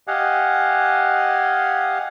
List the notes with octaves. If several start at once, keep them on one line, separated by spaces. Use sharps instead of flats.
G4 D#5 F5 F#5 G#5